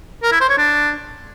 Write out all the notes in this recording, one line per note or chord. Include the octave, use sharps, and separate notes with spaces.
A#4
E4
C5
C#5
D4